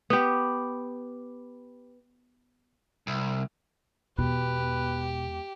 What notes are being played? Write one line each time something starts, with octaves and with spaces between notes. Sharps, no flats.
B3 G4
C2
E2 B2 G#3 G4 B4